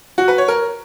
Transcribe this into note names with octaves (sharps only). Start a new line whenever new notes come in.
F#4
B4
C#5
A#4